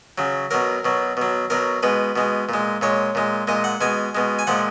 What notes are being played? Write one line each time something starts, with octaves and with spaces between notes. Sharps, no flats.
C#3 F#3
B2 F#3 A#4
B2 F#3
B2 F#3
B2 F#3 A#4
B2 G#3 B4
B2 G#3
A#2 G#3
A#2 G#3 C#5
A#2 G#3
A#2 G#3 D#5
F#5
B2 G#3 G#5
B2 G#3
G#5
A#2 F3 G#3 F#5